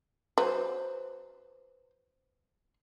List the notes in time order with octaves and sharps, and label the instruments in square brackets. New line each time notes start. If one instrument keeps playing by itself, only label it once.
[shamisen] F#3 [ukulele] B4 C5